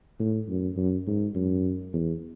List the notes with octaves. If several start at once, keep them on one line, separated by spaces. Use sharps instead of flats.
A2
F#2
F#2
G#2
F#2
E2